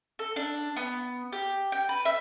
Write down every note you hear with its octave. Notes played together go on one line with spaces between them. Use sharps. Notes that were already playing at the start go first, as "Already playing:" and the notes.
A4
D4
B3
G4
G5
B4
E5